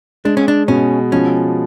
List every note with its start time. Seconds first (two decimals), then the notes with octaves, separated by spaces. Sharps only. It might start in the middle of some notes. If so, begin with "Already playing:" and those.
0.25 G#3 D4
0.37 C#4
0.48 D4
0.68 B2 C#4
1.12 F3 C#4